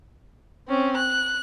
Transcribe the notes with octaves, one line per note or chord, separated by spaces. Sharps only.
C4 C#4
F#6